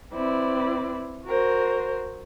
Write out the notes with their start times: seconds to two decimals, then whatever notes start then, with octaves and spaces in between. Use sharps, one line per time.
0.13 C4 E4 B4 D5
1.26 F#4 A#4 C5